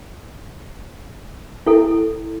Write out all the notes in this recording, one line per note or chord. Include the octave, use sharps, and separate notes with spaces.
E4 A4